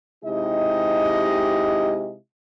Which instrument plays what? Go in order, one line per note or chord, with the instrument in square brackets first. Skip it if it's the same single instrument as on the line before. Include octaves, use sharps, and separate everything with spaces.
[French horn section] C3 G#3 D#4 E4 G4 D#5